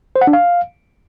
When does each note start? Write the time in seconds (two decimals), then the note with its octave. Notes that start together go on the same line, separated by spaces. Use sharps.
0.16 C5
0.21 F#5
0.27 D4
0.33 F5